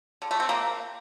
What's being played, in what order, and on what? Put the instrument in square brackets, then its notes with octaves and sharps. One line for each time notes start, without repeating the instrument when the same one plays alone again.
[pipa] D3
A3
C4
A#3